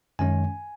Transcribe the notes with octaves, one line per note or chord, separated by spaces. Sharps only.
F#2 D#3 G#3 C#4 G#5